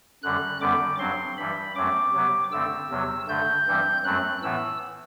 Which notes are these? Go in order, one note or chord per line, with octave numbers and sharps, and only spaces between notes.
F#2 D3 G3 F#6
F#2 D3 G3 B3 D6
G2 F#3 C4 C6
G2 E3 G3 B5
F#2 F#3 A3 C4 D6
C3 F#3 B3
G2 D3 A3 C4 E6
E2 C3 F#3
G2 D3 A3 G6
G2 E3 G3 C4
F#2 F#3 A3 C4 F#6
A2 E3 B3 E6